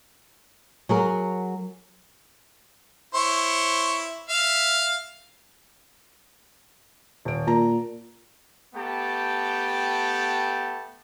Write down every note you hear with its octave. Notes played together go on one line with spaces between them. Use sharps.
F#3 G#4 A#4
E4 C5 C#5
E5 F5
D#1 D7
A#2 A5 A#5
A3 B3 G4 G5 A5